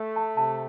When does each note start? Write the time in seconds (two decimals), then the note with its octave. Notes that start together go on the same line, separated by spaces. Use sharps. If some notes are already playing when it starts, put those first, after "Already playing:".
Already playing: A3
0.16 A5
0.37 C3 A5